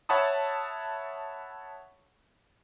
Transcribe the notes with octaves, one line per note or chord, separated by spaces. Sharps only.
C#5 E5 F#5 A5 B5 D#6